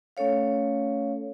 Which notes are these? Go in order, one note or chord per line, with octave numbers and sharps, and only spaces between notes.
A3 C#4 A4 C#5 F5